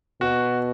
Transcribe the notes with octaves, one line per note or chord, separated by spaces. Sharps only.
B2 F#4